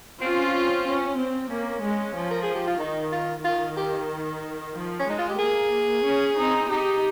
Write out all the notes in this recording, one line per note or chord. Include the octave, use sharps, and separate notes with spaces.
C4 C#4 F4
C#4
C4
A#3 C#4
G#3
F3
A#4
G#4
G4
F4
D#3 D#4
F4
D#3 F4
G4
F3
C#4
G#3 D#4
F4
G4
A#3 G#4
C#4
C4 D#4
D#4 G4